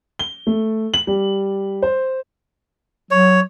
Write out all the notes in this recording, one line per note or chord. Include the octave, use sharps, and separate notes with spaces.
G7
A3
F#7
G3
C5
F#3 C#5